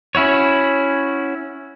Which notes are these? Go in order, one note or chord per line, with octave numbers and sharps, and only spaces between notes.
C#4 E4 F#4 C#5